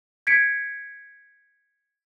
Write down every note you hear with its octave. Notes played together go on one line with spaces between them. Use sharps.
G#6 B6 C#7 D7